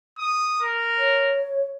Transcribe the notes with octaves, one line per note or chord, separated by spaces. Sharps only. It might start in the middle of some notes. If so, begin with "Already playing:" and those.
D#6
A#4
C#5